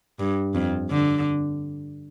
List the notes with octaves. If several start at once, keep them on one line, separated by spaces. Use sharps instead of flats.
G2
F2
D3